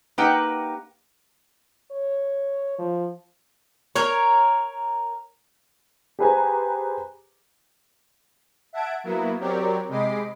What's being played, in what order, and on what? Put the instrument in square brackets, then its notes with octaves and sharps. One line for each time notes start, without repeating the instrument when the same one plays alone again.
[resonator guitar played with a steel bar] A#3 D#4 G4 B4 F#5 G5
[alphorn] C#5
F3
[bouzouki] A#4 C#5
[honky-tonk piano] G4 G#4 B4 C5 G#5 A#5
[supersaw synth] E5 F#5 A5 G#6 D7
F#3 A#3 B3 E4
F#3 C4 G4 A#4 C#5 D5
C3 G#3 D#5 B5 D6 C7